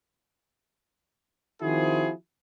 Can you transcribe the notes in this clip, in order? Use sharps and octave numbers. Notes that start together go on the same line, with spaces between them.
D#3 F3 C4 E4 F#4 G#4